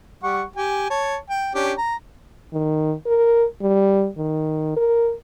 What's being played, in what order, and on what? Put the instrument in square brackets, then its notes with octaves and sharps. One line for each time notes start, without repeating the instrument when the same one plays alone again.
[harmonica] G3 F#5 C#6
G4 G#5
C#5 A5
G5
C#4 D4 G4
A#5
[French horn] D#3
A#4
G3
D#3
A#4